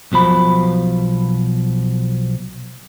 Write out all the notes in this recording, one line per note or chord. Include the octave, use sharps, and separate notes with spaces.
B1 B2 F3 B5